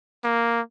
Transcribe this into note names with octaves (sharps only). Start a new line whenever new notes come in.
A#3